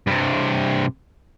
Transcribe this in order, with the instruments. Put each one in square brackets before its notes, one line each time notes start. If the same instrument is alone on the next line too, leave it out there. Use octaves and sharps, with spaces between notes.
[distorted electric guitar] G2 C3